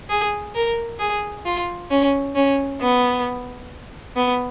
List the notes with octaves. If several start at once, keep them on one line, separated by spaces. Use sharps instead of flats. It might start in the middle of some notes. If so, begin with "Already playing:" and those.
G#4
A#4
G#4
F4
C#4
C#4
B3
B3